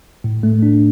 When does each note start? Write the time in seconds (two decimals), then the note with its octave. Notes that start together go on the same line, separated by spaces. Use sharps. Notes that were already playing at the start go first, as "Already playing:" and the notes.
0.24 A2
0.43 A3
0.63 D4